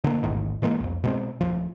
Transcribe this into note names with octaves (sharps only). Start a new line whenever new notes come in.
D3 A#3
E1 A1 G#2 D#3
A2 E3 G#3 A#3
C2 F2
B2 G#3 C4
D1 E2 F3